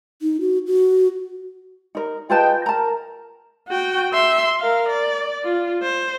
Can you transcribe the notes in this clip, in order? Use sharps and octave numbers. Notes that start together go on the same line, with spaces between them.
D#4
F#4
F#4
D#4 A#4
F4 G#4 B4 D#5 G5 A5
A#4 A5 A#5
F#4 G5
E5 C6
A#4 F5
D5
F4
C5